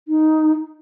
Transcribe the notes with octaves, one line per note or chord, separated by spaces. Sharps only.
D#4